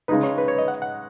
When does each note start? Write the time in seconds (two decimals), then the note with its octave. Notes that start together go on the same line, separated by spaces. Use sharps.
0.08 C#3 G#3 D#4 B4
0.23 C#5
0.38 B4
0.48 C#5
0.58 D#5
0.68 F#5
0.82 F#5